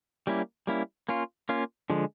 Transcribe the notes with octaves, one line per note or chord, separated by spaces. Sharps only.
G3 A#3 C#4 E4
G3 A#3 C#4 E4
A#3 C#4 F4
A#3 C#4 F4
D3 F3 G#3